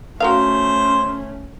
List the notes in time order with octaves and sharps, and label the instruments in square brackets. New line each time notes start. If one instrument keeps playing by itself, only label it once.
[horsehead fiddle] A3 C#4 [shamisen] F#4 A#4 F5 [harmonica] C5